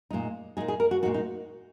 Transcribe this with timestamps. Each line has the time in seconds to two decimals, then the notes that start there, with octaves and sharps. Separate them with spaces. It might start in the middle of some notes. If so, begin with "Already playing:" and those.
0.10 A#2 G#3 D#4
0.57 A#2 G#3 D#4 G#4
0.68 G#4
0.80 A#4
0.91 F#4
1.03 A#2 G#3 D#4 F#4
1.14 D#4